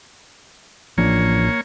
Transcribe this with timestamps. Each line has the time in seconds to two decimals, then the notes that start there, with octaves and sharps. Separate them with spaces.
0.98 A1 F3 A#3 D4 C#5